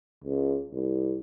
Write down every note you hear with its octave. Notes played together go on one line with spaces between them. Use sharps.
C#2
C2